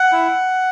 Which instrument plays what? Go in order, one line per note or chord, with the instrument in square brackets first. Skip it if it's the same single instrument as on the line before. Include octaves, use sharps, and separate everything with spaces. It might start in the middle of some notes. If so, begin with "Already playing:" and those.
Already playing: [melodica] F#5
E4